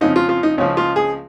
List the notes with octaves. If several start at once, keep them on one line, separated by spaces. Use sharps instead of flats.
F2 C#3 F3 D#4
F4
F4
D#4
C#2 C#3 F3 C#4
F4
G#4